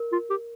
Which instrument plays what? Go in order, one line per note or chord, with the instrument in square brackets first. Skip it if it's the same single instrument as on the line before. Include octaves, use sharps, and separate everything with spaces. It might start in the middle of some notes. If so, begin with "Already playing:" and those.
Already playing: [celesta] A#4
[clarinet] F4
G4